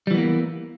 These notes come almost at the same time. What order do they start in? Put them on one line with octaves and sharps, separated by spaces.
G3 E3 B3 A#3